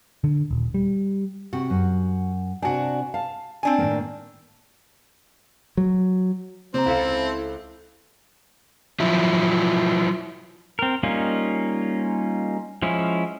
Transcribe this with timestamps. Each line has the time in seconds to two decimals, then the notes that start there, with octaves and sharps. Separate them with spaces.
0.24 D3
0.51 D#1
0.74 G3
1.53 C3 F#4
1.70 F#2
2.62 C3 D4 F#4 G#5
3.14 F5 A5
3.63 C4 D4 G#5
3.78 A2 D#3 A#3
5.77 F#3
6.74 C3 C4 C5 A#5
6.86 C#2 E4 A4 F5
9.00 F3 F#3 E4
10.79 C4 A#4
11.03 G3 A#3 C#4 D#4 F4
12.82 F3 G#3 C#4 E4